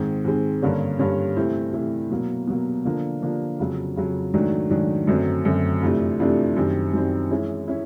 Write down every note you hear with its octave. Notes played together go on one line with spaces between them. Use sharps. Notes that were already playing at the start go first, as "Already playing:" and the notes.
Already playing: G#2 D#3 G#3 C4
G#2 D#3 G#3 C4
G2 D3 G3 A#3 C#4
G2 D3 G3 A#3 C#4
C3 E3 A3 C4 E4
C3 E3 A3 C4 E4
B2 F#3 A#3
B2 F#3 A#3
D3 F3 A#3 D4
D3 F3 A#3 D4
F2 C#3 F#3
F2 C#3 F#3
G#2 D#3 F#3 A3 D4
G#2 D#3 F#3 A3 D4
F#2 D3 F#3 A3 C4
F#2 D3 F#3 A3 C4
F2 C3 E3 A3 D4
F2 C3 E3 A3 D4
F#2 D#3 G3 C4
F#2 D#3 G3 C4
E3 G#3 C#4 E4
C#4 E4